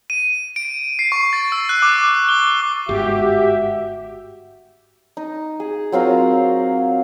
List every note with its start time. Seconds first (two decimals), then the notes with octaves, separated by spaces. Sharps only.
0.10 D#7
0.56 D7
0.99 C7
1.12 C#6
1.33 A6
1.52 E6
1.69 F#6
1.82 D6
2.29 G7
2.89 G1 G#2 F#4 G4 E5
5.17 D#4
5.60 G#4
5.92 F#3 C4 F4 A#4